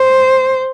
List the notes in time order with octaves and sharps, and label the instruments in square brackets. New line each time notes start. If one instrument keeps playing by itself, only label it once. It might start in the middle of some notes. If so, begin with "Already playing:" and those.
Already playing: [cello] C5